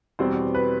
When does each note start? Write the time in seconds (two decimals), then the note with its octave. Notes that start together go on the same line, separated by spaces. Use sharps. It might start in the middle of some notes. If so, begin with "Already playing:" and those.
0.19 E2 B2 G3 C4 C5
0.55 B4